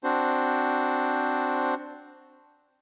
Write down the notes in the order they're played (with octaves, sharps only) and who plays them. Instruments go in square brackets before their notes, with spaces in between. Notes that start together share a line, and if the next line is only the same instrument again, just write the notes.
[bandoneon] C4 D4 F#4 C5